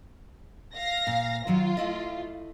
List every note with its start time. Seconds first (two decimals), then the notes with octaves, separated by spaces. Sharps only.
0.74 F5 A#6
1.07 A#2
1.47 D#3 F#3 F4 C#5
1.77 A3 E4 D#5